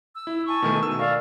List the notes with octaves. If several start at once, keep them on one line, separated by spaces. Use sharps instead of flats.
E6
E4
G#5 A5 C#6
B2 D#3 A3
E6
A#4 D5 F5 C#6